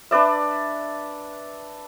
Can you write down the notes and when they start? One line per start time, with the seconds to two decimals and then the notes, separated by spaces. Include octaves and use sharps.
0.11 D4 B4 D5 E5